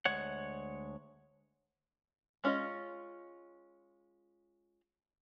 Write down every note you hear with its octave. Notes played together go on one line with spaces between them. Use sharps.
D2 G#3 C#5 F#5
G#3 C#4 F4 C5 D#5